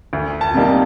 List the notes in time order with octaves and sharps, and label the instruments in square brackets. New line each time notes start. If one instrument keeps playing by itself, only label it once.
[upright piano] D2
A5
C3 G3 A#3 D#4